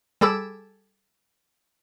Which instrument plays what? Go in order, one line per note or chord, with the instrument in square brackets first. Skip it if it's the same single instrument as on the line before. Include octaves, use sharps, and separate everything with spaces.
[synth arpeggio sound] G3 G#4 A4 B5 D6 E6